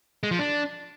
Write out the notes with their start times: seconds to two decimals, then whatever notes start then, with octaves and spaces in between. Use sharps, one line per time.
0.23 G#3
0.31 F3
0.39 D4